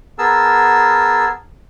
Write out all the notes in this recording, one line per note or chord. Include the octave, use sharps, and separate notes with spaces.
B3 G#4 A#4 A5 E6